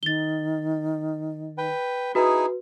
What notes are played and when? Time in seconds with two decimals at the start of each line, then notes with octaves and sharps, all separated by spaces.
0.03 D#3 A6 G7
1.58 B4 G5
2.15 D#4 E4 F#4 G#4 B4